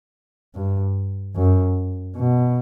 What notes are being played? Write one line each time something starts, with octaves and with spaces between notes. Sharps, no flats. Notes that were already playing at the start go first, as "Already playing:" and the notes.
G2
F#2
B2